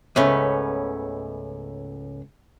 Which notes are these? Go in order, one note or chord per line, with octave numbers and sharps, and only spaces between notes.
C#2 G#2 A3 B3 C#4